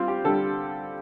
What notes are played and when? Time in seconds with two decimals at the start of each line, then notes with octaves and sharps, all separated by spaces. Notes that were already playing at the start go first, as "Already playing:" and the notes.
Already playing: G3 C4 F4
0.08 G4
0.24 D3 G3 A4